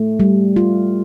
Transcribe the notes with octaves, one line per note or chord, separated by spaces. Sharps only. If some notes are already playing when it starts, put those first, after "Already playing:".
Already playing: A3
G3
F4